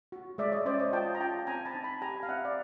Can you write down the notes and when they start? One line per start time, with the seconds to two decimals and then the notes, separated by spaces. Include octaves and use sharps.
0.12 F#4
0.38 G#3 D5 E5
0.52 C#5 D#5
0.65 C#4 C5 D5
0.79 C#5 D#5
0.93 F4 G5 A5
1.15 A#5
1.20 F4 G5 A5
1.47 C4 G#5 A#5
1.65 A5 B5
1.75 D#4
1.84 A5 B5
2.01 G4 G#5 A#5
2.23 F5
2.29 C4 E5 F#5
2.45 D5